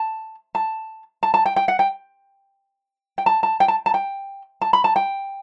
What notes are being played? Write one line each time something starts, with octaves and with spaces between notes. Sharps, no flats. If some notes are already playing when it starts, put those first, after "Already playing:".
Already playing: A5
A5
A5
A5
G5
G5
F#5
G5
G5
A5
A5
G5
A5
A5
G5
A5
B5
A5
G5